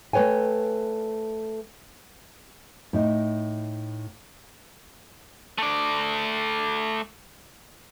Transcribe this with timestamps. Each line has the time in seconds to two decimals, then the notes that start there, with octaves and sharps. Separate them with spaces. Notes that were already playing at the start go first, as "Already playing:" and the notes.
0.13 A3 B4 C#5 G5 G#5
2.93 A2 D#4
5.58 A3 D5